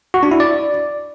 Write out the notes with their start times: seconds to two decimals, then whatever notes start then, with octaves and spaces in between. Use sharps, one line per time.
0.14 F#4
0.23 D4
0.31 E4
0.40 D5